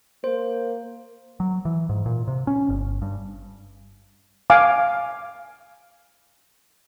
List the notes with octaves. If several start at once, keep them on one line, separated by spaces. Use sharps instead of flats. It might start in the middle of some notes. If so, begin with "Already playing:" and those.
A#3 C5
F#3
E3
G#2
A#2
C3
C#4
G1
G2
F5 G#5 D6